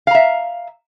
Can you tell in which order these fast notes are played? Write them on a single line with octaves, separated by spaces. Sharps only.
F5 A#5 E5